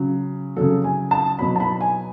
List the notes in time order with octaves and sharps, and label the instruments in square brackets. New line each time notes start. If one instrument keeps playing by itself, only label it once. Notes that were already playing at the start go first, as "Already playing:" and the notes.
Already playing: [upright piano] C#3 F#3
C#3 F#3 A4
G#5
A5
B2 F#3 B5
A5
B5
G#5